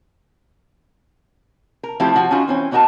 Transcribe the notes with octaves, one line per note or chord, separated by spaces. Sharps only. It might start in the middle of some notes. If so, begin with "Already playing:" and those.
A#4
F3 A3 C4 E4 F4 G4
F3 F#4
C#4 D#4 F4 F#4
E3 C4 C#4
B2 C#4 D#4 F#4 A#4 A5